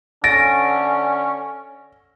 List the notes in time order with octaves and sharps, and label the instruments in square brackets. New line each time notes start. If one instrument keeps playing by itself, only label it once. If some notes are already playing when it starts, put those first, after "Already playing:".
[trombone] D3 [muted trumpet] C#4 [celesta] A6 D7 [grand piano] A#6